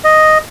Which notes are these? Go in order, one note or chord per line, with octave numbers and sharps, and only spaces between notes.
D#5